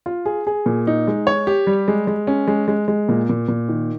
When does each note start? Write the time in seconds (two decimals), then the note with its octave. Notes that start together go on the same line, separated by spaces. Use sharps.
0.06 F4
0.26 G#4
0.47 G#4
0.66 A#2
0.87 D#4
1.07 G#3
1.27 C#5
1.47 G4
1.67 G3
1.88 G#3
2.07 G#3
2.27 C#4
2.48 G#3
2.68 G#3
2.88 G#3
3.09 A#2
3.29 A#2
3.48 A#2
3.69 D#3